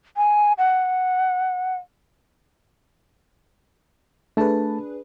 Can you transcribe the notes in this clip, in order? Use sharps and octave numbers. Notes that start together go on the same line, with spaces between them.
G#5
F#5
A3 D4 G#4 B4 A5